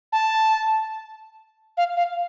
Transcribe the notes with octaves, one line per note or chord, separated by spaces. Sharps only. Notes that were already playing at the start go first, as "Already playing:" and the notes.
A5
F5
F5